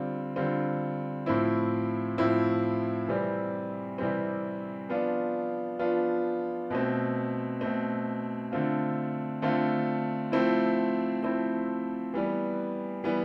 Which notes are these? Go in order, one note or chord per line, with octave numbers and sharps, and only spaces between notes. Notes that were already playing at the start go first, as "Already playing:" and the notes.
Already playing: D3 G3 C4 F4
D3 G3 C4 F4
A2 F3 C4 E4
A2 F3 C4 E4
C3 E3 G3 C4
C3 E3 G3 C4
F3 B3 D4 F4
F3 B3 D4 F4
B2 A3 C4
B2 A3 C4
D3 A3 C4 F4
D3 A3 C4 F4
F3 A3 C4 E4
F3 A3 C4 E4
E3 G3 B3
E3 G3 B3